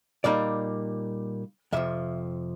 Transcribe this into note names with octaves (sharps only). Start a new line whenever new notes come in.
A#2 G3 A#3 D#4 D5
F2 C3 F3 E5